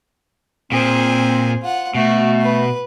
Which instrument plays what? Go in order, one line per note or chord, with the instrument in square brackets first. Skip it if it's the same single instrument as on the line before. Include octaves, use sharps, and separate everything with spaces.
[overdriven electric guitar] A#2 [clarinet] C4 [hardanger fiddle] G#4 C5
[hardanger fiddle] F4 F#5
[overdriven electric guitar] B2 [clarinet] A3 [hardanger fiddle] F#4
[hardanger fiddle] B4